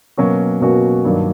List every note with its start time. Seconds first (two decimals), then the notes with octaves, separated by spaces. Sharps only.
0.17 B2 F#3 A#3 C#4 F#4
0.61 B2 F#3 A#3 C#4 F#4
1.05 G2 D#3 F#3 A#3 D4